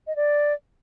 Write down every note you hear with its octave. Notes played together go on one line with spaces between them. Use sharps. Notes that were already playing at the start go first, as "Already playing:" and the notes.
D#5
D5